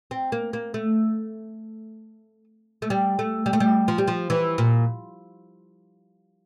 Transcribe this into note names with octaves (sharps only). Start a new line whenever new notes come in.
C4
A#3
A#3
A3
A3
G3
A3
G3
A3
G3
F3
G3
F3
E3
A#2